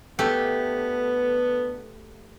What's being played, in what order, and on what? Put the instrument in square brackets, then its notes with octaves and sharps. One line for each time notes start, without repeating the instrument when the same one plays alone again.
[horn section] D3 B3 [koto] A3 [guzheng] G4